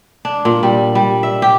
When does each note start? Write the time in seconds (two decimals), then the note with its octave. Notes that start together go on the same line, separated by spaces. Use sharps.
0.25 D4
0.45 A#2
0.63 G3
0.95 G3
1.23 E5
1.42 G4